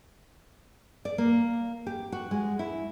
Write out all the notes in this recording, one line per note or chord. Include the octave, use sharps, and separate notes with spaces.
D5
A#3
G4
F#4
G#3
E4